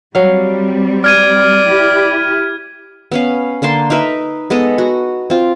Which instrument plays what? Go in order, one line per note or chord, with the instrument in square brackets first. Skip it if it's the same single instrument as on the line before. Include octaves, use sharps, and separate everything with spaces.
[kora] F#3 F5 [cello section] G3 C4
[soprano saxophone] D5 [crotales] F6 G#6 D#7
[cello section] E4 G4
[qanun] B3 C#4 F5
D3 A#3 A5 C6
D#4 A#4 B4 E5
G#3 B3 A4 D#5
F#4
C4 F4